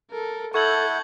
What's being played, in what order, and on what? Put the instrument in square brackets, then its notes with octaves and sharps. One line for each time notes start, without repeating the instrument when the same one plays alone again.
[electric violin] A4 A#4
[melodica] E4 F#5 [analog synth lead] A4 [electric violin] A5 G6 [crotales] C#6 G#6 F#7